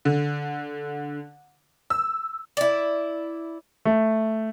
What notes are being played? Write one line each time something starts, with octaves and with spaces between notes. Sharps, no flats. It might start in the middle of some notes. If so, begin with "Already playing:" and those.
D3
E6
E4 D5
A3